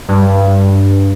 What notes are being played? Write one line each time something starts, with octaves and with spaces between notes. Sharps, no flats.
G2